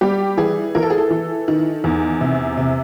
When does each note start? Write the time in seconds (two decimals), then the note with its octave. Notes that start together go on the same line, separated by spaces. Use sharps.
0.01 G3 G4
0.37 E3 G#4
0.75 E3 A#4
0.83 A4
0.90 G#4
0.98 A4
1.10 E3
1.48 D#3
1.84 E2
2.21 C3
2.57 C3